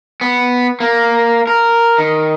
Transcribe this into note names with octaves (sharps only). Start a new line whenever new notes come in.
B3
A#3
A#4
D#3